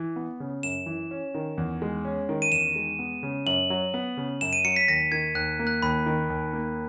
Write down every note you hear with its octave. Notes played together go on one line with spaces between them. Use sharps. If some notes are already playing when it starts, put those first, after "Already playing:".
Already playing: E3
B3
C#3
F#2 E7
E3
C#4
D#3
E2
G#3
C#4
D#3
D#7
E2 E7
G#3
B3
C#3
F#2 F#7
F#3
B3
C#3
F#2 E7
D#7
F#3 C#7
B6
D#2 A#6
D#3 G#6
D#2 F#6
A#3
F#6
D#2 B5
D#3
D#2
A#3